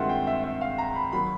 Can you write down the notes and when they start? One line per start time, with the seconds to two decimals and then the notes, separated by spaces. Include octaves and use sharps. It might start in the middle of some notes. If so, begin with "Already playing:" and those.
Already playing: G2 D#3 G#3 C4 F4 E5 F#5
0.09 G5
0.27 E5
0.44 E5
0.61 F5
0.78 A#5
0.95 B5
1.12 D#3 F#3 A#3 B5